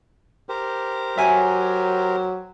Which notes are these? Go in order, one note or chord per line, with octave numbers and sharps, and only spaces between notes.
G4 A#4 C5
F#3 E5 G#5